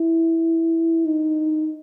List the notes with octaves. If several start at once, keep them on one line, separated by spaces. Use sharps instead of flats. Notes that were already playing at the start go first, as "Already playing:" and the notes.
Already playing: E4
D#4